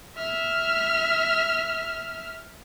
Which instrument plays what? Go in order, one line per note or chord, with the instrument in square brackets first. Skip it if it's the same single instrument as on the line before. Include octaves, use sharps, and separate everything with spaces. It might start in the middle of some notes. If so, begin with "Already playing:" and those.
[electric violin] E5 F6